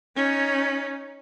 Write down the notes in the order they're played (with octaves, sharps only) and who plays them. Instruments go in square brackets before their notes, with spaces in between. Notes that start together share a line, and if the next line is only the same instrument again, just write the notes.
[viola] C#4 D#4